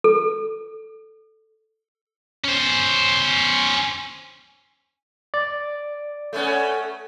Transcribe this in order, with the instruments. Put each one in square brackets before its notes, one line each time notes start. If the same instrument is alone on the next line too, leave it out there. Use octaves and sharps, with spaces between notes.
[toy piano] A4
[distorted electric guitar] C#4 C5
[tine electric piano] D5
[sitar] A3 B3 C#4